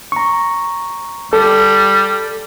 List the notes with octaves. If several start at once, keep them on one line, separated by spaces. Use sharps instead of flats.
A#5 C#6
G3 A4